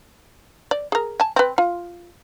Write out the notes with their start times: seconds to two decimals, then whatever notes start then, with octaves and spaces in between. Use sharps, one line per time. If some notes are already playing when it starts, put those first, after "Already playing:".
0.71 D5
0.92 G#4 A#4
1.20 G#5 A5
1.36 C4 B4
1.58 F4